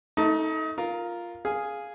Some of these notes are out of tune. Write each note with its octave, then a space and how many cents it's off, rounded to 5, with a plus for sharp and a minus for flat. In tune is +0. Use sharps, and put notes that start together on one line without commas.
A3 +0 D#4 +30 A5 +30
F4 +0 A#4 +0
G#4 +0 F5 +0 G#5 +0